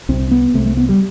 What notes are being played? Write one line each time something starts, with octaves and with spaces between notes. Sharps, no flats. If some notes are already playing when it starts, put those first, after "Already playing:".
C2 C3 C4
B3
C2 C3 A3
A3
B3
G3